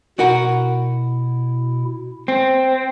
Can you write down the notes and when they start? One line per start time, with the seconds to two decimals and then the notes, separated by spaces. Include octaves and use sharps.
0.19 B2 E4 F#4 A#4 F#5
2.28 C4 C5 G5